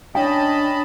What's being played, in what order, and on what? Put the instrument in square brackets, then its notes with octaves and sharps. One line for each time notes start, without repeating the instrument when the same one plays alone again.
[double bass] C#4 [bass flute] D4 [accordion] D#5 A5 B5 [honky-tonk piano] G5